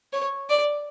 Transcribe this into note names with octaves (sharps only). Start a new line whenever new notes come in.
C#5
D5